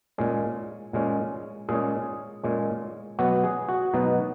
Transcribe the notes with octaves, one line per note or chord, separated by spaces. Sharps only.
A#2 G#3 C#4
A#2 G#3 C#4
A#2 G#3 C#4 G#4
A#2 G#3 C#4
B2 F#3 B3 F#4
G#4
F#4
B2 F#3 B3 D#4